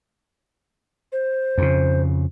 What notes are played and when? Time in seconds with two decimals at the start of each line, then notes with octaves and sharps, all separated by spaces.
1.12 C5
1.58 F2 C#3